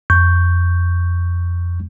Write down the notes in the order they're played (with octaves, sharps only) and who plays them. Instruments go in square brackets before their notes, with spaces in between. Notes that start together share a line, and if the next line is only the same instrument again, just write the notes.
[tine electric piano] F2 C#6 G6